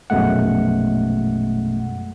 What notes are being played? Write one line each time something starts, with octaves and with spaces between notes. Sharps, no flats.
A#1 F#2 B2 G#3 A3 F#5